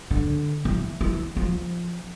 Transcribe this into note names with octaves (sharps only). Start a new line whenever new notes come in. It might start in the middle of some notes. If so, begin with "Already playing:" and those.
D3
E3
E3
F3